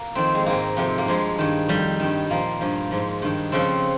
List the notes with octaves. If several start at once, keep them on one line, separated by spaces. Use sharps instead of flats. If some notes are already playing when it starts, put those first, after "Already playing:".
Already playing: A#3
F2 D#3 C4
G#3
G#2 D#3 A#3
F2 C3 F3
A#3
G2 F3 G#3
G2 D#3
F2 D#3 G3
G2 D#3
A#2 F3 A#3
G2 F3
G#2 F3
G2 D#3
F2 C#3 F3 C4